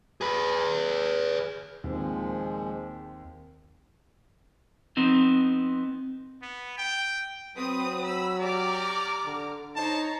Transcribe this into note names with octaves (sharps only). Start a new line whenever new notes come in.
G#4 B4
D#2 A#2 F3 G#3 C4
F3 B3 C4 D#4
B3
G5
F#3 C4 B4 D#6
B5 E6
G4 D5 A#5 D6 F6
D3
D#4 C5 C#5 A5 A#5